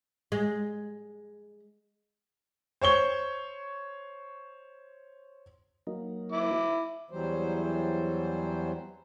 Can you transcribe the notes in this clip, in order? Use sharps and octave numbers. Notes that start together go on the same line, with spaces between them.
G#3
C5 C#5 C#6 G7
F#3 A#3 D#4
E4 D6
E2 E3 F#3 G3 C5